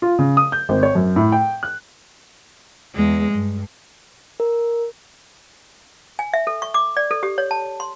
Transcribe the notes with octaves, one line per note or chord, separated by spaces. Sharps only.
F4
C#3
D#6
G6
G#1
C#5
F#2
A2
G5
F#6
E2 G#3
G2
A#4
G#5
E5
A4
C#6
D6
D5
A4
G4
C#5
A5
C6